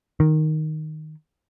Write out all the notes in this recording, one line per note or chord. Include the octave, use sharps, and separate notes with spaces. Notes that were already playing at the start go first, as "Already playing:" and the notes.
D#3